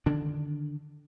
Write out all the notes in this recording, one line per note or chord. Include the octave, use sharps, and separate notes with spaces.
D3 D#3 D4